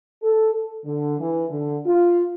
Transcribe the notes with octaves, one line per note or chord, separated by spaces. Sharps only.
A4
A4
D3
E3
D3
F4